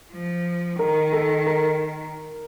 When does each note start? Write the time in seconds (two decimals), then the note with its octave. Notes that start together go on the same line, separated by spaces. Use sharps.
0.13 F3
0.79 D#3 A#4
1.12 A4
1.46 A#4